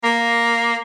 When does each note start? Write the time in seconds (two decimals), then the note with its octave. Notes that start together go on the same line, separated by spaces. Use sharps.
0.04 A#3